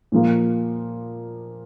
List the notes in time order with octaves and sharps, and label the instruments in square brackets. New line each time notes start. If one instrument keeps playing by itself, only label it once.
[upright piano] A#2 F3 A#3